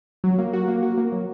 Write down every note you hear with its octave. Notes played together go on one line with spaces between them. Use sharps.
F#3
A#3
F#4
A#3
F#4
A#3
F#3